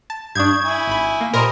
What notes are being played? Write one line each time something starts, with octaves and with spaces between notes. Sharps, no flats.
A5
G2 D4 C#6 D#6 G6 G#6
E4 G#5
G#1 B5
A#3
A#2 G3 A#4 C5 D#5 B5 C6